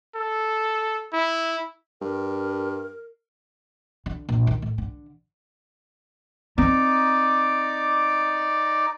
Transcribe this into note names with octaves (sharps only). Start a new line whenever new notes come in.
A4
E4
G2 A#4
D3
A#1
D#3
A2
D3
C4 D#4 D5 D6